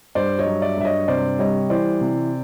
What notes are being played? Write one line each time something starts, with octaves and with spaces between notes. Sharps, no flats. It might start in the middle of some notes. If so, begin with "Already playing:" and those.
G2 C5 D5
C#5 D#5
F#3
D5 E5
G2 E5
C#5 D#5
C3 C5 D5
G3 C#5 D#5
E3 C5 D5
C3